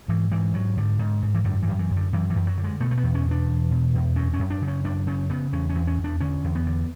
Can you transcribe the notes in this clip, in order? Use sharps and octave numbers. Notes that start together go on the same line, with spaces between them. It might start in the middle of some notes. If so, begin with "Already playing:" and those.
G#2 E3
G#2 E3
G#2 F#3
G#2 D3
G#2
G#2
E3
F#2 D3
E3
F#2
E3
F#2
D3
F#2 E3
E3
F#2
F#3
D3
G#3
B2 A3
A3
B3
E2
C#4
B2 D4
E2
B2
E2
F#2 C#4
C#4
F#2
D4
C#3
C#4
F#2 D4
C#3 C#4
C#3 B3
E2 C#4
C#4
E2
C#4
E2
D4
D3 C#4
E2
B3
D3